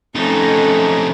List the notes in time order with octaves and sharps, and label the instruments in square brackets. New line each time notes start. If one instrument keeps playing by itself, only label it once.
[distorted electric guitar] F2 D#4 [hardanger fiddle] A3 C#4